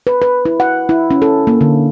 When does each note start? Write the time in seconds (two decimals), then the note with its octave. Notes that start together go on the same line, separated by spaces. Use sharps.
0.07 B4
0.22 B4
0.45 E4
0.60 F#5
0.89 E4
1.11 C#4
1.22 A4
1.47 A#3
1.61 D3